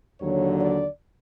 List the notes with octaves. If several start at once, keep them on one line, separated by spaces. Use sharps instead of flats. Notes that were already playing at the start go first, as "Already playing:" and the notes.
D#2 D3 F#3 C#5
D5